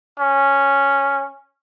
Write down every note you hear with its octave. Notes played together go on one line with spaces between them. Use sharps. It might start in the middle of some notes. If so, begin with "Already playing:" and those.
C#4